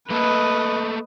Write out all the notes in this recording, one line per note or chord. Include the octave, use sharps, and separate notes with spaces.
A3 A#3 A4 B4 D#5